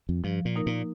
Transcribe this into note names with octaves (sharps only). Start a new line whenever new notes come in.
F2
G2 F3
A#2
A#3 D#4 A#4
A#2